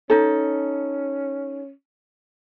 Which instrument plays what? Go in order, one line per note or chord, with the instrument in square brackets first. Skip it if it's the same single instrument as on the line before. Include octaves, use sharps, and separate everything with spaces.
[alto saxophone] C#4 [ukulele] D#4 A4